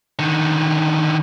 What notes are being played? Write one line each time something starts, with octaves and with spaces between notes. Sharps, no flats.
D3 D#3